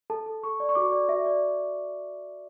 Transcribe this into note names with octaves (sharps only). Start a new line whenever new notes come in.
A4 A5
A4
A4 C#6
D5
C#6
F#4 D6
D5
F#4 E5
D5